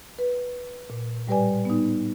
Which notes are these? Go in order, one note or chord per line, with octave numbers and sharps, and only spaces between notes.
B4
A#2
A2 G3 G4 B4 D5 G#5
B3 D#4